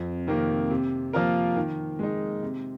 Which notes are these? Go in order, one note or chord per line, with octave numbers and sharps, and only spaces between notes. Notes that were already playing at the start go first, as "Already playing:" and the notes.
Already playing: F2
C3 D#3 A#3
C3
F3 A#3 F4 A#4
D#3
G#3 D#4
C3